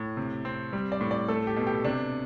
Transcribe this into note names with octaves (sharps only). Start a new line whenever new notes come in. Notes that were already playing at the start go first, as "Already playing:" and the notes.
Already playing: A2
C3
C4
G3
D5
A2
D5
A3 A4
G4
B2
G4
C3 D4